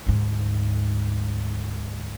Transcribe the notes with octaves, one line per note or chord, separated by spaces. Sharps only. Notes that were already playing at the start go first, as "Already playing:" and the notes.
D2 G#2